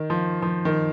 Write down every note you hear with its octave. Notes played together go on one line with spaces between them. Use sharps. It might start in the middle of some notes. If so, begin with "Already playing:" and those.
Already playing: D#3
F3
F3
D#3